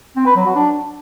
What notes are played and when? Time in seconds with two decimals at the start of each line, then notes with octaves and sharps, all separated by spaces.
0.16 C4
0.26 B4
0.36 F#3
0.46 F#4
0.55 D4